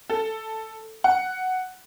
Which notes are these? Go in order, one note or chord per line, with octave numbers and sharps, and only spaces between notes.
A4
F#5